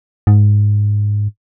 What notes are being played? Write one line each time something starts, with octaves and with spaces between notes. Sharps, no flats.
G#2